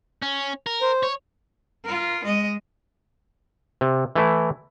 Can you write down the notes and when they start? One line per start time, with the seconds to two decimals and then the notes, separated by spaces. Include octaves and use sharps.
0.22 C#4
0.66 A#4
0.82 C5
1.03 C#5
1.85 F4 A#4
2.24 G#3 D#5
3.81 C3
4.15 E3 A3 E4